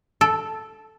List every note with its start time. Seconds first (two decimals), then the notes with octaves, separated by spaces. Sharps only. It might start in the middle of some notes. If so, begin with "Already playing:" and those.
0.21 A4